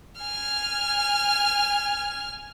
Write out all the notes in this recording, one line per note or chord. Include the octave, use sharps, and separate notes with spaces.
G#5 F6